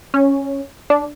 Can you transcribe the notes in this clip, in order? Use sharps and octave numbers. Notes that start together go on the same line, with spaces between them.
C#4
D4